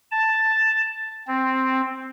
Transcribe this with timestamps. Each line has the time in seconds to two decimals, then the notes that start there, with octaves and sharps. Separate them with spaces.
0.11 A5
1.28 C4